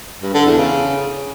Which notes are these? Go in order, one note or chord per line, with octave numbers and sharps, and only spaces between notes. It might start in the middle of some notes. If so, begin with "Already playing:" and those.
G2
D3
E2
C#3